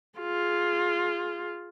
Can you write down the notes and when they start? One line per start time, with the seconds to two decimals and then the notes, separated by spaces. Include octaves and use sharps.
0.20 F4 G#4